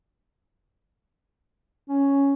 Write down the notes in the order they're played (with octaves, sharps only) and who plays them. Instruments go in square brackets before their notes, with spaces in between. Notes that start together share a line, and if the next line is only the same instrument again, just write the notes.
[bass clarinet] C#4